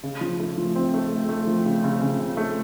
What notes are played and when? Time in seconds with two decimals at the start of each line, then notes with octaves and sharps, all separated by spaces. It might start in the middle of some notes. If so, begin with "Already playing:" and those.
0.03 C#3
0.21 F3
0.40 A3
0.58 F3
0.75 C4
0.94 A3
1.11 A3
1.29 A3
1.47 F3
1.66 C#3
1.84 C#3
2.01 C#3
2.20 C#3
2.37 A3